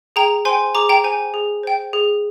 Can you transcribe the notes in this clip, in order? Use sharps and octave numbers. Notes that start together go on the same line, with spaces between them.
G#4 G5 A#5
C5 G5 G#5 C6
G#4 A#5 D6
G5 A#5
C5 G5 G#5
G#4
C5 G5
G#4